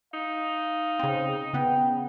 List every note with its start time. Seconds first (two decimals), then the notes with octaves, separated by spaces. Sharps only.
0.14 D#4 F5
0.99 C#3 C4
1.53 C#3 B3 G5